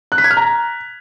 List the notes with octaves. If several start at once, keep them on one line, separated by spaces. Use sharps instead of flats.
F#6
B6
G#6
F6
A#5